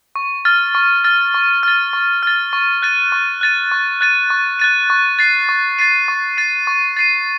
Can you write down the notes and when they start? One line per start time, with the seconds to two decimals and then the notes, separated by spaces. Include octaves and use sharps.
0.16 C#6
0.45 F6 A6
0.75 C#6
1.04 F6 A6
1.34 C#6
1.63 F6 A6
1.93 C#6
2.23 F6 A6
2.53 C#6
2.82 F#6 A6 D#7
3.12 C#6
3.41 F#6 A6 D#7
3.72 C#6
4.01 F#6 A6 D#7
4.30 C#6
4.60 F#6 A6 D#7
4.90 C#6
5.19 A6 C7 D#7
5.49 C#6
5.79 A6 C7 D#7
6.08 C#6
6.37 A6 C7 D#7
6.67 C#6
6.97 A6 C7 D#7